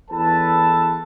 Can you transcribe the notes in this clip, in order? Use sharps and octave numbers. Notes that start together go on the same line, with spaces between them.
E2 A4 B4 A5